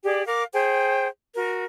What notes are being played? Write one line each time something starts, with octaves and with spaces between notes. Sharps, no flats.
G4 G#4 D5
A#4 F5 D6
G#4 C5 G5
F#4 A#4